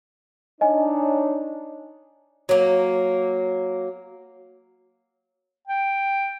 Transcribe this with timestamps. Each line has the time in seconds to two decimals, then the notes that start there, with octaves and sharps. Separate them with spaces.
0.61 D4 D#4 C#5 D#5 G#5
2.49 F#3 A#3
5.67 G5